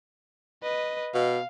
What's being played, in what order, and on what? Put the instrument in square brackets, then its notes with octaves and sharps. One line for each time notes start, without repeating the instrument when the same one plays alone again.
[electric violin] B4 D#5
[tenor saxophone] B2 [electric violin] F5